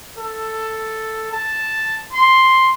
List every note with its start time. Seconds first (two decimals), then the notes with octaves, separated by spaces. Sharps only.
0.19 A4
1.32 A5
2.13 C6